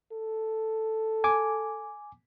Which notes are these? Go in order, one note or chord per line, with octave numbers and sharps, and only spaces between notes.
A4
G#5 D6